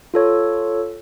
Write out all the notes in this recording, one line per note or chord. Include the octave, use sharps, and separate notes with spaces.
F4 A4 C#5